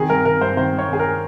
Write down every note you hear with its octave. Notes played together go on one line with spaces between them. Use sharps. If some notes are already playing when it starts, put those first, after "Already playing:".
Already playing: D#3 G#4
G2 A#4
D#3 A#4
G2 C5
D#3 C5
G2
C#5
D#3 G#4
A#4